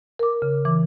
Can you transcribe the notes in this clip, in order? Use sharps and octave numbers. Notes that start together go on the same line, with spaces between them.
A#4 D6
C#3
E3 D6